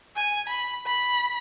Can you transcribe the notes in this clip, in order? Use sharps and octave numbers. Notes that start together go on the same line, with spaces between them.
G#5
B5
B5